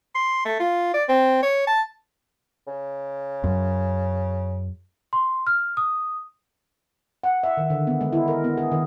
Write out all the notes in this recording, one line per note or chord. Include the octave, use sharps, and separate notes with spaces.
C6
A3
F4
D5
C4
C#5
A5
C#3
F#2
C6
F6
D#6
F#5
E5
D#3
D3
B3
G#3
E4
A#4
B3
G#4
D#3